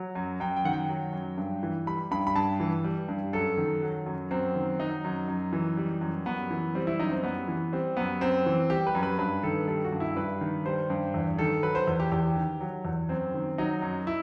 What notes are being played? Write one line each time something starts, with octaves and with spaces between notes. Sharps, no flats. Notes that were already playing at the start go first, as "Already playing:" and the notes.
Already playing: F#3
F#2
F#2 G5
G5
D#3 F#5
G5
F#3
F#2
G2
E3
G3 B5
G2 B5
B5
G2 A5
E3
G3
G2
F#2 A4
D#3
F#3
F#2
F#2 C4
D#3
F#3 D#4
F#2
F#2
E3
G3
F#2
F#2 B3
E3
G3 C4
E4
F#2 D#4
C4
F#2 B3
E3
G3 C4
F#2 B3
F#2 C4
E3
G3 G4
B4
F#2
B4
G2 B4
D#3 A4
G3 A4
F#4
G2
E4
G2 B4
D#3
G3 C5
G2
E2
D#3 A4
F#3 B4
C5
E2
G4
E2 G4
D#3
F#3
E2
F#2 C4
D#3
F#3 D#4
F#2
E4